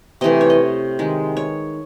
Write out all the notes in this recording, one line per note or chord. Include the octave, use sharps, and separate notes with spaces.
C3 E3 A3 D#5
C#5
D#5
D#3 G#3
C#5